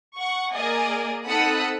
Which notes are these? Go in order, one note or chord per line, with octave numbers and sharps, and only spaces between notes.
F#5 C#6
A#3 G#4 A#4 D5 D#5 G#5
C4 D#4 A4 F#5 B5 D#6